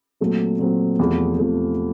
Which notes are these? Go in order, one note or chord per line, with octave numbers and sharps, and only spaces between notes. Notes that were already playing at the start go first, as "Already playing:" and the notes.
A#2 F#3 A3 C4
A#2 F#3 A3 C4
E2 C3 F3 A3
E2 C3 F3 A3